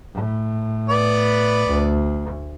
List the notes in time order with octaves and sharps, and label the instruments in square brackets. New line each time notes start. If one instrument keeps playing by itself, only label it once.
[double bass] A2
[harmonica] B3 B4 D5
[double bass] D2